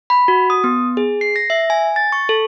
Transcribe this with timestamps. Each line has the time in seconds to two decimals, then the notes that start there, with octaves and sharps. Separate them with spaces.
0.10 B5
0.28 F#4
0.50 D#6
0.64 B3
0.97 G#4
1.21 C7
1.36 A#6
1.50 E5
1.70 G#5
1.96 A6
2.12 C#6
2.29 A4